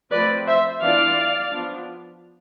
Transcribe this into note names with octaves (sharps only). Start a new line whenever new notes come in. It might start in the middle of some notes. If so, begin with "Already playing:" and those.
F3 A3 C4 B4 D5
C5 E5
E3 B3 D4 F4 D5 F5
F3 B3 D4 F4